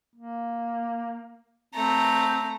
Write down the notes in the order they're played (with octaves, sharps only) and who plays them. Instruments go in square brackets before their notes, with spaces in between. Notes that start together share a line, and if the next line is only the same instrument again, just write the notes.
[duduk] A#3
[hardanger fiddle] A3 A#5 [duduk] C4